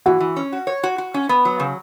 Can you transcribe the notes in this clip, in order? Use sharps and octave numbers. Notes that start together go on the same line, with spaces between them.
E3 F#4
E3
C#4
F#4
C#5
F#4
F#4
C#4
B3
F#3
C#3